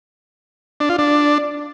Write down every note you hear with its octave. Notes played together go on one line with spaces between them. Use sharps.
D4
F4
D4